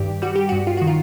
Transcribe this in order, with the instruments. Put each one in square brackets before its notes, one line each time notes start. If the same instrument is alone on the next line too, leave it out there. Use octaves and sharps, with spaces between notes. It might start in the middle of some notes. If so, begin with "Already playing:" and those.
Already playing: [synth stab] G2 D#3 G4
G3 F#4
G4
G2 F#4
F4
D#3 F#4
F4